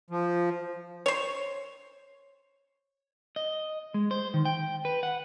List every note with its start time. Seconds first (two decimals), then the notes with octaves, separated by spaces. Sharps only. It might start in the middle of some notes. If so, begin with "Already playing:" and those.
0.10 F3
1.06 C5 C#5
3.36 D#5
3.94 G#3
4.11 C5
4.34 D#3
4.45 G5
4.85 B4
5.03 F#5